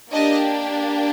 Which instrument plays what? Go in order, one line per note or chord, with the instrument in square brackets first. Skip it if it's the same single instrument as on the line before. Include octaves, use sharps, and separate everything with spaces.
[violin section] A#3 D4 G4 D#5